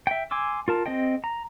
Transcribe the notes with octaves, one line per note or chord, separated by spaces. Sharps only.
E5 G5
G#5 C6 D6 E6
F4 A#4 A5
C4 G#4 D#5 G5
A#5